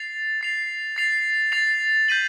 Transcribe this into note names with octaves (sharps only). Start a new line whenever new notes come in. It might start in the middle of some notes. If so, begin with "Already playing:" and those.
Already playing: A6 C7 F7
A6 C7 F7
A6 C7 F7
A6 C7 F7
G6 B6 D#7 F#7